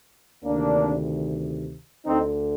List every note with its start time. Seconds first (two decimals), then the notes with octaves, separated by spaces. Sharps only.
0.44 D2 C3 D#3 A#3 D4
2.06 D2 D3 C4 D#4